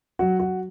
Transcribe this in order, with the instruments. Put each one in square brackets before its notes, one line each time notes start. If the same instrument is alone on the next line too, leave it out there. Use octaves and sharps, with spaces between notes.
[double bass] F#3 [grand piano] F#4
[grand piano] F#4